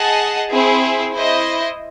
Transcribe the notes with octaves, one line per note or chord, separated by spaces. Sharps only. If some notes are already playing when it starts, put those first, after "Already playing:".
Already playing: G#4 D#5 F#5 A5
C4 E4 G#4
E4 C5 D#5